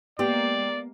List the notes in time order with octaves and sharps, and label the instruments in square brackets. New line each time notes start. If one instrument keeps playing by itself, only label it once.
[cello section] G#3 A#3 [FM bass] B3 [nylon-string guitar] G4 [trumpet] D5